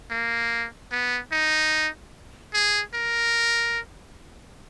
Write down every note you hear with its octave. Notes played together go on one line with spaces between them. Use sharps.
A#3
B3
D#4
G#4
A#4